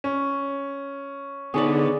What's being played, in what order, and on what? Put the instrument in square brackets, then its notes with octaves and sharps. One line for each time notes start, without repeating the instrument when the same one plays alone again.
[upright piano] C#4
[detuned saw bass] D3 [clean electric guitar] B3 D#4 B4 [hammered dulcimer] G#4 C#5 D5